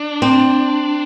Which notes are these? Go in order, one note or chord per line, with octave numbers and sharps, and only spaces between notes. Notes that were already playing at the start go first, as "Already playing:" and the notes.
Already playing: D4
C4